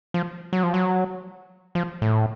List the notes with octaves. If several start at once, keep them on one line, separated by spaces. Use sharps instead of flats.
F3
F#3
F3
F#3
F3
A2